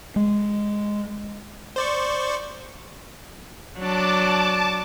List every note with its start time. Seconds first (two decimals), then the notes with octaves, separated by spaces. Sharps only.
0.16 G#3
1.76 C5 D5 C#6
3.78 F#3 D4 A5 D6